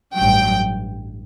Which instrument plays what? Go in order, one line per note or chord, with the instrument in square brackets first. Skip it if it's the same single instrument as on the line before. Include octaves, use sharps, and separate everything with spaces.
[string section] A1 G2 F#3 G5